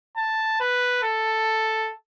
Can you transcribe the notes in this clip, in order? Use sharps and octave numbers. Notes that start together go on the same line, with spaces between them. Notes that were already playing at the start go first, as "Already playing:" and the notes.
A5
B4
A4